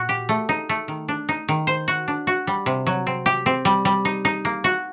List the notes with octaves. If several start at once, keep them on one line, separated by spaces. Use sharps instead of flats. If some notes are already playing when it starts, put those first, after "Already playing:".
Already playing: A#2 F#4
G4
A3
D#4
A3
D#3
D4
D#4
D#3
C5
F#4
D4
F#4
G3
C3
F#3
C4
G4
C4
G3
G3
D#4
D#4
A#3
F#4